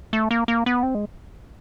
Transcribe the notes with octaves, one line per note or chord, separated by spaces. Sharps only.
A3
A#3
A#3
B3
C4
G#3